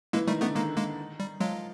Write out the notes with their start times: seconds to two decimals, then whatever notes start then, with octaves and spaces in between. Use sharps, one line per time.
0.13 E3 G#3 A#3 E4
0.27 D#3 G3 A3 D#4
0.41 D3 A3 B3 D4
0.55 D#3 G#3 A#3 D#4
0.77 G#3 A#3
1.20 G3
1.40 F3 F#3 G#3 F4